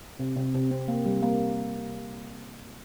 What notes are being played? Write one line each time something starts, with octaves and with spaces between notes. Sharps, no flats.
C3
C3
C3
C4
A#3
G3
A#3